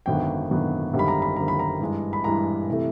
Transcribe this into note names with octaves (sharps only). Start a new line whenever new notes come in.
G#1 F#2 D3 F#3 B3 G5
G#1 F#2 D3 F#3 B3
G#1 F#2 D3 G3
B5
A#5
B5
G#1 F#2 D3 G3 A#5
B5
A#5
G2 E3 G#3
B5
G2 E3 G#3 A#5
C3 E3 A3